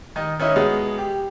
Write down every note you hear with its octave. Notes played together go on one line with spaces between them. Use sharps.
D#3 D#5
D#3 C#4 E4 D#5
B2 G#3 B3 D#4 G#4
G4